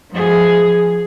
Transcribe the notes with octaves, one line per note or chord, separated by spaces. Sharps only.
F3 G#4